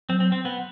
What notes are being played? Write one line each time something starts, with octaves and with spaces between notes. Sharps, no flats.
F#3 C4
C4
C4
B3